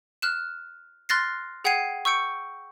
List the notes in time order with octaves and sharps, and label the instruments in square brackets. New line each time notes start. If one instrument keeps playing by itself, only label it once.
[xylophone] F6 F#6 E7
C6 F6 F#6 A6 A#6 C7
G#4 F#5 G5 G#6 C7 D#7
C#6 E6 G6 C#7 D7